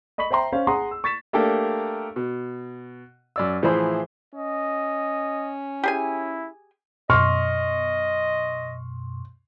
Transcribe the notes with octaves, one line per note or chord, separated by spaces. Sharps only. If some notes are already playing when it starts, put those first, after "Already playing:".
D#5 B5 C#6 B6 F#7
C5 E5 G5 A#5 C6
C#4 C5 F5
G#4 F#5 A#5 C6 D#6
E6
C#6 A6 B6 E7
A3 A#3 D4 G4 A4 A#4
B2
F#2 D5 E6
A2 E3 F3 G#4 C5 B5
C#4 D#5
E4 G4 G#4 G#5
F#2 B2 D#5 C6 C#6 F6